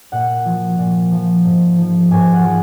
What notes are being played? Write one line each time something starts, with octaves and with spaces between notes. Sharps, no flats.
A#2 F#5
F3
A#2
F3
G#2
F3
G#2 G#5
F#5
F3